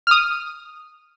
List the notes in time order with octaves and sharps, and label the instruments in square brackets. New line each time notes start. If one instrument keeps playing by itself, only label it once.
[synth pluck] D#6 F6